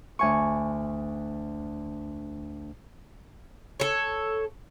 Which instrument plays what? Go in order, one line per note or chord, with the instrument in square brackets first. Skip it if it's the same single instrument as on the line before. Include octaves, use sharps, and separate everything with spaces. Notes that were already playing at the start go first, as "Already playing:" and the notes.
[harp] D2 G#5 C#6
[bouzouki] A4 C#5